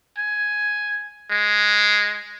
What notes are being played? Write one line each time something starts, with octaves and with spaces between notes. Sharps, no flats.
G#5
G#3